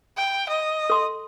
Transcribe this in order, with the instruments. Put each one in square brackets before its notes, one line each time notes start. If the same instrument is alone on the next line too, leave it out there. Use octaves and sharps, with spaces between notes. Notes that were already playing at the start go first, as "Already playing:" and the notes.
[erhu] G5
D#5
[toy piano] A4 C6